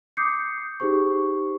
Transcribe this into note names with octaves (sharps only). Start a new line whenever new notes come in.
D6 D#6 G6 C7 C#7
D#4 G4 G#4 C5 C#6